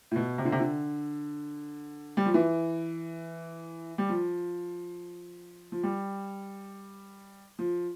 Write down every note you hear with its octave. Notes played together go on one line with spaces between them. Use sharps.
A2
B2
C3
D3
C3
D3
G3
F3
E3
G3
F3
F3
G3
F3